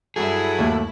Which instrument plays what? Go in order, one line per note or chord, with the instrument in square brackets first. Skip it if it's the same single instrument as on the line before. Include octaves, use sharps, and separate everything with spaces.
[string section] G2 E4 [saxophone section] F#3 A4 [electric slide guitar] G#4
[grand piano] D#2 A3